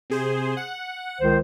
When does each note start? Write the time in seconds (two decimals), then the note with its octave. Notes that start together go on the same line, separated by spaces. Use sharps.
0.10 C3 G#4 C5
0.57 F#5
1.19 C#2 D#3 C5